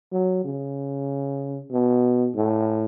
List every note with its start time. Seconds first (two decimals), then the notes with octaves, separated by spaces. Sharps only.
0.12 F#3
0.45 C#3
1.72 B2
2.35 A2